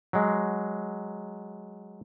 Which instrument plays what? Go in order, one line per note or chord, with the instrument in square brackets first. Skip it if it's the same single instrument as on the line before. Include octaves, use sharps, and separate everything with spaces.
[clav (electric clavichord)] F#3 G#3